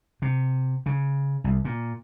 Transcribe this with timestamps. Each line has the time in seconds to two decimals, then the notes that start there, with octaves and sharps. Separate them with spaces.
0.22 C3
0.86 C#3
1.44 C2
1.65 A#2